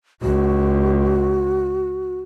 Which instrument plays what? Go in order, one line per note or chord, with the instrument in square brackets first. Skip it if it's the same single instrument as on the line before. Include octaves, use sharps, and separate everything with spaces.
[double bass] C#2 [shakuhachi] F#4